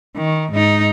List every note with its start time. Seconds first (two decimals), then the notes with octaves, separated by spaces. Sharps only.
0.16 D#3
0.52 G#2 D#4